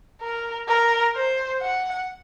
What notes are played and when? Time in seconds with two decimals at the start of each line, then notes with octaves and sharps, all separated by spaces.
0.22 A#4
0.68 A#4
1.16 C5
1.62 F#5